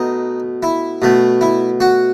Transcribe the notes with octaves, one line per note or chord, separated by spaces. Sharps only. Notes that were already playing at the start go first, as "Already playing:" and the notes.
Already playing: B2 A3 D#4
E4
B2 A3
E4
F#4